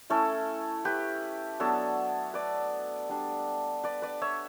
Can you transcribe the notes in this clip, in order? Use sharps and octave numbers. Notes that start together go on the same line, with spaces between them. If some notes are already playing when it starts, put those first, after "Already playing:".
A3 C#4 E4 A4 C#5
G4 B4
F#3 B3 D4 A4 C#5
B4 D5
G3 D4
B4 D5
B4 D5
C#5 E5